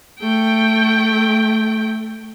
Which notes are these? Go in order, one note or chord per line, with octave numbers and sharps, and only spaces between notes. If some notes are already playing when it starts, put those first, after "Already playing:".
A3 G5